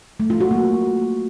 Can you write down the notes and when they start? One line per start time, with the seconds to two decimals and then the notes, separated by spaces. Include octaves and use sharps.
0.20 A3
0.30 F4
0.41 F#4
0.51 A#3